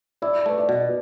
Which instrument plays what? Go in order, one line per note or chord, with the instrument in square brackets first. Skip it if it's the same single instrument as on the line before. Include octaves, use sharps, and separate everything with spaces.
[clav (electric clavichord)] E4 [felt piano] D5
[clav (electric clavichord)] A3 [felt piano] B4
[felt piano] D5
[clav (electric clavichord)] B2